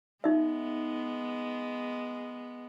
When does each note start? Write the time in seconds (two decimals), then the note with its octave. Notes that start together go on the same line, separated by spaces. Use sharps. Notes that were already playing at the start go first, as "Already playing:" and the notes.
0.24 G#3 B3 D#4 E5